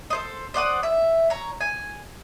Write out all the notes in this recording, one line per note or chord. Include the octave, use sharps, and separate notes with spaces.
A4 C5 D#5
C5 D5 F#5 D#6
E5
C#5 A#5
G#5